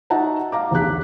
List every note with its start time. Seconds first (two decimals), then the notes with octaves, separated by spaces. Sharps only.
0.10 D#4 F#4 E5 F#5 A5 A#5
0.52 F5 A#5 D6
0.71 B1 E2 D3 G4 F#6 B6